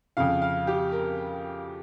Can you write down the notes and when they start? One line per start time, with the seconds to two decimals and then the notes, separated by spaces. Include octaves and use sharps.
0.17 F2 C#3 F5
0.42 F5
0.67 G4
0.92 A#4